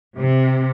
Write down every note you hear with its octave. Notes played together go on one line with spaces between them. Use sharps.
C3